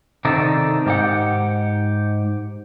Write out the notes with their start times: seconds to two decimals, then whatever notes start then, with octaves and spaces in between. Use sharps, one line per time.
0.25 C3 D#3 D4 D#4 A4
0.86 G#2 G4 F#5